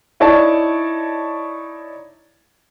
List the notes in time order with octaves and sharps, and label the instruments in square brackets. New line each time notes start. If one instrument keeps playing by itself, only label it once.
[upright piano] D#4 E4 C#5 D5 A5